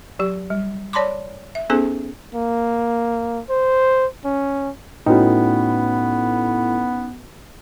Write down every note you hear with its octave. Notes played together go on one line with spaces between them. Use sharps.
F#3 G4
G3
C#5 D5 A5 B5 C6 D6
E5
B3 C#4 D#4 G#4 A4 C5
A#3
C5
C#4
A2 B3 C#4 D#4 F#4 B4 G5